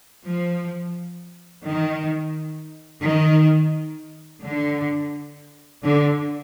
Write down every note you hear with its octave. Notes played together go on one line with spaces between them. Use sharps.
F3
D#3
D#3
D3
D3